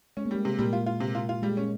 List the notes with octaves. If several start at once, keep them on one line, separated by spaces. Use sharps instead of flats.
G#3 C#4
A#3
G3 G#3
C3
A#2 G3 A#3
F4
F4
C3
F4
F4
G3 G#3
C#4